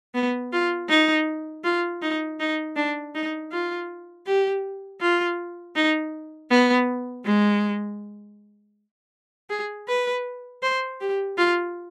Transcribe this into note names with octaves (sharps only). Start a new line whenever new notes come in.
B3
F4
D#4
F4
D#4
D#4
D4
D#4
F4
G4
F4
D#4
B3
G#3
G#4
B4
C5
G4
F4